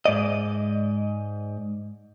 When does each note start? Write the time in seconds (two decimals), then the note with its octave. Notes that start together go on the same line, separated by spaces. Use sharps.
0.06 G#2 D5 D#5